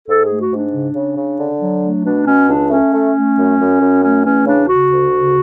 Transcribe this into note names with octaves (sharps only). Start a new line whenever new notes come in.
G#2 A4
G#4
A3
F#4
G#2
D4
C#3
C#3
C#3
D3
F#3
A3
B2 D4
B2 C#4
C#2 D4
A3 C#4
A3
A3
F#2
F#2
F#2
A3 C#4
E2 C#4
C#3 D4
C#3 F#4
D2
C#3